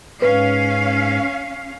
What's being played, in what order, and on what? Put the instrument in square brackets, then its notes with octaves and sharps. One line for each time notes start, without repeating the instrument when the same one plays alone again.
[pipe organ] G#2 [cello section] C#4 F5 [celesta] B4